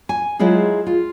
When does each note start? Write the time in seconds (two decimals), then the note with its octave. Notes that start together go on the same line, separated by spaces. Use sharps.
0.09 G#5
0.39 F#3 G#3 E4 F4 G#4
0.87 F4